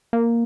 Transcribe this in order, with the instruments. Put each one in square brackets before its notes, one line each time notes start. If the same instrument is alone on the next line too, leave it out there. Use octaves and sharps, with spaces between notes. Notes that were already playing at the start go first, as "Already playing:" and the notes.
[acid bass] A#3